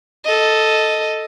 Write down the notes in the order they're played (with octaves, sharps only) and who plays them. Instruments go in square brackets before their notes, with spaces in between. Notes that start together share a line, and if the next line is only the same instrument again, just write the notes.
[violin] A4 D#5